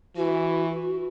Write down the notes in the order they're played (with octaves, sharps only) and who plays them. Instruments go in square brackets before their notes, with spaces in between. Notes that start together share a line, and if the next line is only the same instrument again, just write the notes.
[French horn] E3 [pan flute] F#4